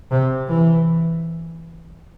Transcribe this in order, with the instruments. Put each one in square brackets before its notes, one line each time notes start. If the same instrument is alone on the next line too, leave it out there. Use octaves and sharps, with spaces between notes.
[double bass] C3
E3